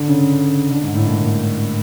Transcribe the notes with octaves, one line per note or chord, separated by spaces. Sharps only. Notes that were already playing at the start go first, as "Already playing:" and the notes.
Already playing: D3
C#3
D3
G#2
A2
A#2